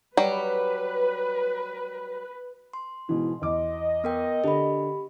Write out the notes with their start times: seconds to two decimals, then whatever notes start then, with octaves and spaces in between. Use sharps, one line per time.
0.17 F#3 G3 B4
2.73 C6
3.09 G#2 B2 E3
3.42 E2 D#5 D6
4.04 B3 A#4 G5
4.44 D3 G4 B5